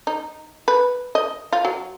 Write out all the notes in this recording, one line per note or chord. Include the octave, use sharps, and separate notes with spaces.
D#4
B4
D#5
F4
F#3